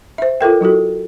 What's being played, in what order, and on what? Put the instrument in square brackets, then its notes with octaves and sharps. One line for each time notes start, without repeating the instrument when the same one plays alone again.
[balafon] C5 E5
F4 A4 A#4 G5
F#3 E4 F#4 A4